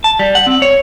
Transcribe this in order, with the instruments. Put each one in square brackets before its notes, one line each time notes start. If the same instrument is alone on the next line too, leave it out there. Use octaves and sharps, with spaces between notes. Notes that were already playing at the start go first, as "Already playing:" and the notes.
[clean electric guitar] A5
G3
F#5
C4
C#5